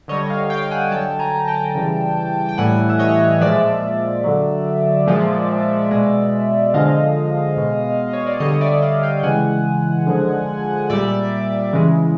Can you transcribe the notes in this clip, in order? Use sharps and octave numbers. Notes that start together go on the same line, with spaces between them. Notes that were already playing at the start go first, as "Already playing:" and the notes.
D3 G3 C#5 D#5
D#5 F5
F5 G5
F#5 G#5
D3 F#3 G5 A5
G#5 A#5
A#5
G5 A5
C#3 E3 G3
G5
A2 E3 G3 F#5 G#5
E5
C#5 D#5
A#2 F3 G#3 D5 E5
D3 F#3
A#2 F3 G#3
B2 G#3
D3 F3 G#3 D#5 F5
B2 G#3
C#5
D5
D3 G3 C#5 D#5
D5 E5
D#5 F5
F5 G5
G5
C#3 E3 G#3 F#5 G#5
D3 F3 G#3
A#2 G3 D5 E5
C#3 E3 G#3